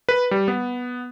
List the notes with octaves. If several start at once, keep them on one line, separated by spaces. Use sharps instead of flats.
B4
G3
B3